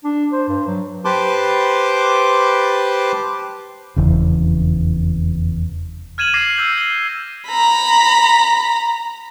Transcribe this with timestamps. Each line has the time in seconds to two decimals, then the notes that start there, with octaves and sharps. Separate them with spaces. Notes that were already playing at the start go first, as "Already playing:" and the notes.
0.05 D4
0.33 C5
0.49 G2
0.67 F#3
1.05 G4 B4 C5 A5 C6 D6
3.96 F1 E2 C#3
6.18 F6 G#6 D#7 E7 F#7
6.34 D6 G#6 A#6 C7 D#7 E7
6.56 E6 G6 F#7
6.78 C7 G7
7.48 A#5 B5